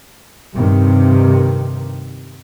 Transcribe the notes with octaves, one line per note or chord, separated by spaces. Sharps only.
G2 C3 D#3